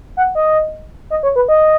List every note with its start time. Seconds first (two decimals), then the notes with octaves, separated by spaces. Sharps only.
0.17 F#5
0.35 D#5
1.10 D#5
1.23 C#5
1.36 B4
1.48 D#5